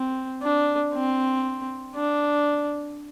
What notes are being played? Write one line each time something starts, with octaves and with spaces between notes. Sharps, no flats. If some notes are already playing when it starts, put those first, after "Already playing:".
Already playing: C4
D4
C4
D4